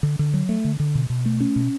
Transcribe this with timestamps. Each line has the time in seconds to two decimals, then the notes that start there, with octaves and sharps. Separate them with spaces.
0.03 D3
0.19 D3
0.34 F#3
0.49 A3
0.65 D3
0.80 D3
0.95 B2
1.10 B2
1.26 A3
1.40 C#4
1.56 B2